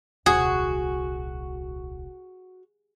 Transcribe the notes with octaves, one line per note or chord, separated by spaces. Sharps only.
D#1 C2 F#4 G#4